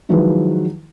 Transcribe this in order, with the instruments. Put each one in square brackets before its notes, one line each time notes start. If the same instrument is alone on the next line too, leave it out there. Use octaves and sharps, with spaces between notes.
[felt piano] D#3 F3 F#3 G#3 E4 B4